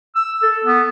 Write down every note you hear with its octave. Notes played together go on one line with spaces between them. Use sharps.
E6
A4
B3